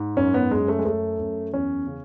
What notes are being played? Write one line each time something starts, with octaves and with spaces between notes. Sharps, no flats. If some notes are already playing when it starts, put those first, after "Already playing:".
Already playing: G#2
F#2 C#4
B3
F#2 G#3
A3
G#3
F#2 A3
F#2
E2 C#4
C#3